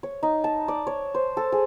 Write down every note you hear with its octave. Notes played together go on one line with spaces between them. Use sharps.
C#5
D#4
A5
D5
C#5
C5
A4
G#4